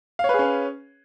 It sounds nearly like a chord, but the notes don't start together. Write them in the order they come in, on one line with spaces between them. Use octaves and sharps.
F5 C#5 B4 G#4 C#4